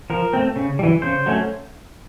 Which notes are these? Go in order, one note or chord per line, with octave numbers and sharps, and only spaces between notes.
F3 A#4
A3 C4
C#3
G3
E3
C#3 C5
F#3 A3 C#4